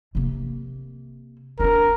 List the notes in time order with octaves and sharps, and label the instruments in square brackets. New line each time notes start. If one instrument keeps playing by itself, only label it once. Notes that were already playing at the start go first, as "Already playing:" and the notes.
[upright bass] C3 A#3
[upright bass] D4 D#4 [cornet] A#4